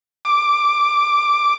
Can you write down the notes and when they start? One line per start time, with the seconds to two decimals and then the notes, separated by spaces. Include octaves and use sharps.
0.25 D6